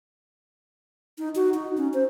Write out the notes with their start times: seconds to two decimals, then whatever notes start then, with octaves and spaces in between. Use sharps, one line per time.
1.18 D#4
1.35 F#4
1.54 D#4
1.77 C#4
1.94 C5